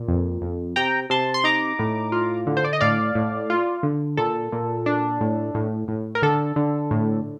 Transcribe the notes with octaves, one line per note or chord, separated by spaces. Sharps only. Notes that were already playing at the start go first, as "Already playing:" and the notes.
Already playing: A#2
F2
F2
C3 G5 A#5
C3 A5 C6
C6
D#4 A#5 D6
A2
F4
D3
C5
D5
D#5
A2 D5 F5
A2
F4
D3
A#2 A4
A#2
D4
A2
A2
A2
A#4
D3 A4
D3
A2